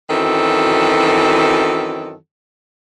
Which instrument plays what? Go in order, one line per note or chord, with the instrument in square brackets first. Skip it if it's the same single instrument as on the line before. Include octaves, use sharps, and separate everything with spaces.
[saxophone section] F#2 D#3 E3 F#3 C4 A4